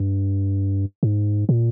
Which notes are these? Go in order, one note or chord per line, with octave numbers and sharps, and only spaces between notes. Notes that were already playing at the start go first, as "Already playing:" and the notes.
Already playing: G2
G#2
A#2